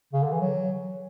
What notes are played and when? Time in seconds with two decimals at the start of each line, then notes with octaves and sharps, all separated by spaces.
0.13 C#3
0.23 D3
0.32 E3
0.41 F#3